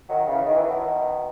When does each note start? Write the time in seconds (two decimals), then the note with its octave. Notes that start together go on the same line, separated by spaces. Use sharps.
0.09 D#3 F#3
0.27 C#3 E3
0.45 D#3
0.55 E3
0.66 B2 D#3